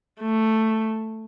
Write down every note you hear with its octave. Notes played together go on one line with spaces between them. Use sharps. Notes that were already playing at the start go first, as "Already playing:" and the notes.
A3